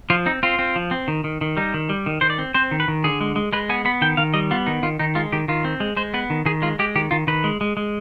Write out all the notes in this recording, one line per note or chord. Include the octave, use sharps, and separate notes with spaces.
F3 F4
C4 D#4
C4 F4
C4
F3
C4
D#3
D#3
D#3
G3 D#4
D#3
G3
D#3
D#3 C5
D5
C4
C4 C5
D#3
B4
D#3
D3 G#4
G#3
G#3
G#3 B4
B3 G#5
B3 B5
D#3 G5
D#3 F5
G3 D#5
B3 F4
D#3 D#4
D#3 F4
D#3 D#4
G#3 F4
D#3 G4
D#3 F4
C4
G#3
G#3 C5
B3 B4
D#3
D#3 G#4
G#3 F4
G#3 G4
D#3 G4
D#3 F4
D#3 B4
G#3
G#3
G#3